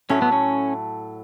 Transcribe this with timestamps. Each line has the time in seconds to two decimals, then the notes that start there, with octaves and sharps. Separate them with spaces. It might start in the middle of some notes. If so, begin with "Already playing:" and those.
0.09 A2 F#3 A3 C#4
0.22 B3
0.32 C#4